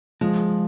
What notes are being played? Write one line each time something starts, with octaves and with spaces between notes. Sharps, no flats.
F3 G#3